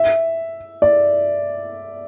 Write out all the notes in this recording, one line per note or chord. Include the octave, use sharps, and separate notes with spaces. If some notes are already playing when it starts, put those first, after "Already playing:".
Already playing: E5
D5